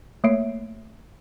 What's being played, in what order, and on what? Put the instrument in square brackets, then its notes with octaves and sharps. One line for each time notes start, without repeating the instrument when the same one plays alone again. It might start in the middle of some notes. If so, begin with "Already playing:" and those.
[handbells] A3 A#3 C#5 E5 C7 D7